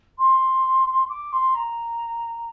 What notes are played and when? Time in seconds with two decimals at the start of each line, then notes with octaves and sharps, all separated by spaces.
0.18 C6
1.09 D6
1.33 C6
1.55 A#5